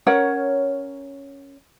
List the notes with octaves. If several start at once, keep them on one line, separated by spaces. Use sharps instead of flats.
C#4 A#4 C#5 F#5